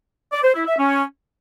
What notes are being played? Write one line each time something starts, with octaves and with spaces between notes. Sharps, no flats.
D5
C5
E4
E5
C#4